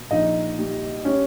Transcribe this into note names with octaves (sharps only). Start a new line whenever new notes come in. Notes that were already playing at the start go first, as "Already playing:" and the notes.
Already playing: B2
A#1 D#4 D#5
G3
G3 C#4 C#5